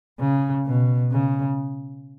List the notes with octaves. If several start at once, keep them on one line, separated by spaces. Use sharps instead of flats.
C#3
B2
C#3